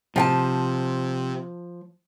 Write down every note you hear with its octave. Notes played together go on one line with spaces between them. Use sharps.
C3 F3 G5 A5